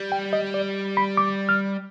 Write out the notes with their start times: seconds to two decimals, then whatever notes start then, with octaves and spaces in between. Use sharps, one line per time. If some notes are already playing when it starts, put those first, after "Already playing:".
Already playing: G3
0.12 G5
0.33 D#5
0.54 D5
0.97 B5
1.17 D6
1.49 F6